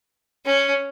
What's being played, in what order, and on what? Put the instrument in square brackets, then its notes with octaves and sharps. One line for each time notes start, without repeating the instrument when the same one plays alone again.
[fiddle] C#4